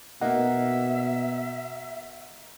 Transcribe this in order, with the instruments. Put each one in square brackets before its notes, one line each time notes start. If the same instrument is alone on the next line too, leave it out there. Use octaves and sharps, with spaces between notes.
[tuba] B2 [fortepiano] A#3 D#4 [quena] E5 [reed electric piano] F#5